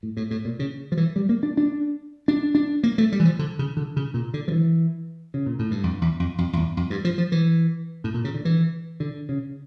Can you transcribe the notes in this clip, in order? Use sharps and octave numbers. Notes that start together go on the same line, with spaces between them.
A2
A2
A2
A#2
C#3
F3
E3
G3
A#3
D4
D4
D4
D4
A#3
A3
G3
E3
F3
D3
C#3
D3
C#3
A#2
D3
F3
E3
C#3
A#2
A2
G2
F2
E2
F2
F2
F2
E2
F2
G2
F3
F3
E3
A2
A#2
C#3
D3
E3
D3
C#3